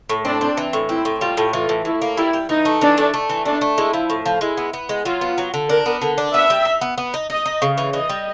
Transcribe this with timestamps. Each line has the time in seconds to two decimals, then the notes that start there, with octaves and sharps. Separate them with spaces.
0.09 A2
0.25 C4 D4
0.41 C4
0.57 E3
0.73 A2
0.89 C4 E4
1.05 A2
1.21 G3 F4
1.37 A2
1.53 E3 F4
1.69 A2
1.85 A2 E4
2.02 A#3
2.17 G3 E4
2.33 G3
2.49 E3 D#4
2.65 A3
2.81 E3 D4
2.98 A3
3.14 A3
3.29 E3
3.45 A3 D4
3.61 A3
3.77 G#3 E4
3.93 F3
4.10 A2
4.26 F3
4.41 G#3 E4
4.57 B3
4.73 B3
4.89 G#3
5.05 F#3 F4
5.21 B3
5.38 F#3
5.54 D3
5.69 D4 A#4
5.86 B3
6.02 D3
6.18 D4
6.34 B3 E5
6.50 G3
6.65 D#4
6.81 B3
6.98 B3
7.14 D#4
7.30 D#4 D#5
7.46 D#4
7.62 C#3
7.78 E3
7.93 E3 D#5
8.10 G3